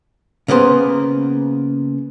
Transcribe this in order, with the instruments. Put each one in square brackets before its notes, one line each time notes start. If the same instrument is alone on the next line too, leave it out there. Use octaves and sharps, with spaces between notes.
[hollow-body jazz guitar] C#3 A#3 B3 C5